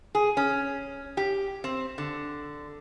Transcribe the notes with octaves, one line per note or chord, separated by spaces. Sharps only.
G#4
C#4
G4
C4
D3